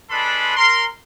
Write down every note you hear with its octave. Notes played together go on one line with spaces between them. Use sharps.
G#3 D4 A4 B4 B5 C6
A#4 C6